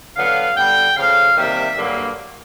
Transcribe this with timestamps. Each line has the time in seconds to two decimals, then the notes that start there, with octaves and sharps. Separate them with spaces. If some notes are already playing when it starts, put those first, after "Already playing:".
0.15 D3 F#3 B3 F5
0.55 D3 G3 B3 G5
0.95 C#3 F3 A3 F5
1.35 C3 D#3 G3 A#3 E5
1.75 G2 D3 F#3 A#3